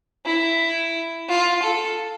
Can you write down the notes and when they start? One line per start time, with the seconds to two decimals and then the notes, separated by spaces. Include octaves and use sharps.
0.25 E4
1.29 F4
1.63 A4